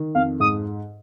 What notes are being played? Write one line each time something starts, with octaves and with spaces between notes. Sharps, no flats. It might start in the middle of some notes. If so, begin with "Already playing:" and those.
Already playing: D#3
F2 F5
G#2 D#6